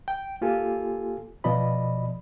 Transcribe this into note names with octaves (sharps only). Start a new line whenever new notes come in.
G5
A#3 F4 G4 A4 G#5
B2 F3 D5 D#5 B5